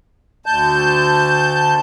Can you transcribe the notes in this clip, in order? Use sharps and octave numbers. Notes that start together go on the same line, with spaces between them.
D2 A5 G6